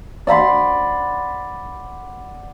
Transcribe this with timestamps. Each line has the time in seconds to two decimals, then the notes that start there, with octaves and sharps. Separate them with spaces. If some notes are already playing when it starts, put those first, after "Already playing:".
0.27 D5 F#5 B5 C6